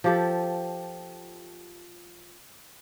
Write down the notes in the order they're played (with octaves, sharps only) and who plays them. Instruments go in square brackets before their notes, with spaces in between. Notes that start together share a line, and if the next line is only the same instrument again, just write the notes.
[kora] F3 G4 A4